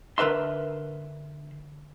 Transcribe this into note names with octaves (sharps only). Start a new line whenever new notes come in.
D3 A#4 B4 E5 C6